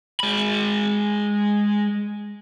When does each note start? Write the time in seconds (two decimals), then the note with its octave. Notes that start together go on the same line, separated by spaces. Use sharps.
0.20 G#3 B5